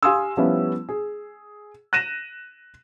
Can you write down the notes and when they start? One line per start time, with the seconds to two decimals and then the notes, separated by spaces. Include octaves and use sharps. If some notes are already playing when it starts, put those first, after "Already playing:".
0.03 G4 F5 G#5 C6 D#6 E6
0.37 F3 G3 B3 C#4 E4
0.89 G#4
1.93 F#6 A#6 D#7 E7